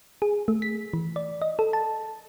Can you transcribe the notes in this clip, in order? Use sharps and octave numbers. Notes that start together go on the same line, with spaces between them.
G#4
A3
B6
E3
D5
D#5
A4
A5